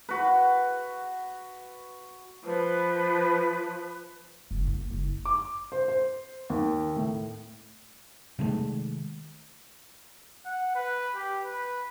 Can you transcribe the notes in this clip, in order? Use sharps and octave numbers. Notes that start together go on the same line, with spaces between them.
F#4 B4
F3 B4
F#1
A#3
F#1
D6
C5
C5
D#2
A2
C3 D#3 G#3 A3
F#5
B4
G4
B4